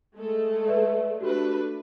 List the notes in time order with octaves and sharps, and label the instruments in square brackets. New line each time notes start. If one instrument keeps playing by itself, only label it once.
[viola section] G#3 A3 A4
[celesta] B4 D5 E5
[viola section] A3 D4 B4 [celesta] F#4 G4